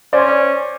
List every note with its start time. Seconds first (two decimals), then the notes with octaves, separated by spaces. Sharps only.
0.13 C#4 C5 D5